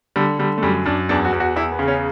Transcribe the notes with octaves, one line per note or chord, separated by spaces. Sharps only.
D3 G3
D3 G3
A3
F#2 G3
F#2 D4
E2 D4
F#4
E2
F#4
E2 E4
B3
C#3
C#4